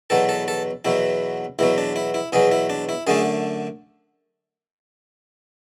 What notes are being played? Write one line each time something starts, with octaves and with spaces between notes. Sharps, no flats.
E2 B2 F#3 A4
A4
A4
E2 B2 F#3 E4
E2 B2 F#3 E4
D4
E4
E4
E2 B2 F#3 G#4
E4
D4
E4
F#2 D3 A3 D4 G#4